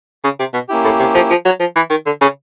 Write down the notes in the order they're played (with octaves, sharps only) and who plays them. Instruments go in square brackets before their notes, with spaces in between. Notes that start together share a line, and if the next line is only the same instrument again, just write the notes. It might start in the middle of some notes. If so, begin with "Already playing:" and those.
[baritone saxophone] C#3
C3
B2
[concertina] A#3 C#4 E4 G4
[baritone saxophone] A2
C3
F3
F3
F#3
F3
E3
D#3
D3
C#3